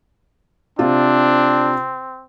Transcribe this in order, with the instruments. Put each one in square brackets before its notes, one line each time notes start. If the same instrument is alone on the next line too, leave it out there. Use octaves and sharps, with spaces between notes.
[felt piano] C3 F4 [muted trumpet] C4 [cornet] D4